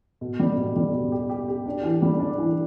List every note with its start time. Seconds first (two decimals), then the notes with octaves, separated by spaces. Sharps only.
0.21 B2
0.40 G3
0.57 B2
0.76 G3
0.94 B2
1.12 G4
1.29 G4
1.48 G4
1.66 D4
1.83 E3
2.02 G3
2.19 D4
2.38 E3